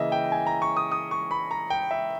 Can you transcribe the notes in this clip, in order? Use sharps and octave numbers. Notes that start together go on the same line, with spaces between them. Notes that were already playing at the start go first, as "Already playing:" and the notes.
Already playing: C#3 E3 A#3 D#5 E5
G5
G#5
A#5
C#6
D#6
D#6
C#6
B5
A#5
G5
E5